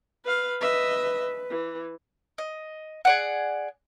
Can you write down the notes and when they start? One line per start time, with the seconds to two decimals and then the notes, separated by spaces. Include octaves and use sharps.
0.24 B4 F5
0.61 B4 D#5 E5
1.50 E3
2.38 D#5
3.05 G#4 D5 F#5